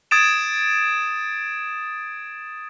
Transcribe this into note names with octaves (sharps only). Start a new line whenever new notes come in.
D#6 G#6 A6 D7 E7